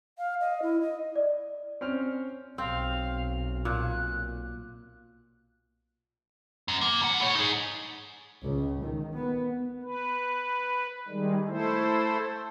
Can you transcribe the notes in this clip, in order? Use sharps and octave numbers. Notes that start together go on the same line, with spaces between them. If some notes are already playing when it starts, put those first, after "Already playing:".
F5
D#5
E4
D#5
D5
C4 C#4 F6
B1 C4 F5
A#2 F#6
F#2
A#3
D#2 F#5
A2 C#5
D#4 G#4
C#2
D#3
B3
B4
D#3 G3 G#3
A3 E4 A4 C5